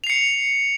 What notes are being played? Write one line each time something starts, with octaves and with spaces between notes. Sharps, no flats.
C7 C#7 F7